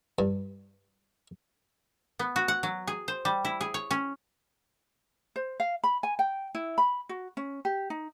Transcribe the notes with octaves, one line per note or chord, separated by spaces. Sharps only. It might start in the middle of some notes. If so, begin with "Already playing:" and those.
G2
B3
F#4
F#5
F#3
G#4
C5
G3
E4
G#4
C#5
C#4
C5
F5
B5
G#5
G5
E4
B5
F#4
C#4
G4
D#4